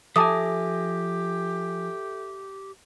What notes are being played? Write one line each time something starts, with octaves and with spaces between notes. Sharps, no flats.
F3 G4 A4 E5 G#5 A5 D6 D#6